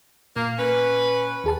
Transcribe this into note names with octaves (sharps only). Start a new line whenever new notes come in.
A#2 A#3
C#4 B4
D#2 G#4 A5